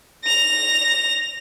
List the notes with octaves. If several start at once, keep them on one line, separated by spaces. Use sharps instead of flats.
A#6 F7